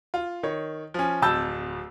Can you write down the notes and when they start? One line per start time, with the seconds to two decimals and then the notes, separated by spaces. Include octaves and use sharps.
0.14 F4
0.43 D#3 C#5
0.94 F3 C#4
1.22 D1 F2 A5 E6 G6